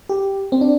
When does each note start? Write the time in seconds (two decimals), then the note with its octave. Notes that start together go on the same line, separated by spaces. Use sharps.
0.09 G4
0.52 C4
0.61 D4